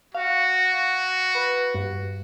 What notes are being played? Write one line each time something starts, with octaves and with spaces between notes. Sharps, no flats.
F#4 F5
B4
G2